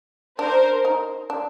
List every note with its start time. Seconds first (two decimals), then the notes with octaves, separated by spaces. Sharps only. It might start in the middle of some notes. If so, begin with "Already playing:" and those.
0.39 D4 A#4 C5
0.85 D#4
1.30 D4